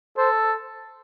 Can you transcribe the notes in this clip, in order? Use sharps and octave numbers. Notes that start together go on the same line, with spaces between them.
A4 C5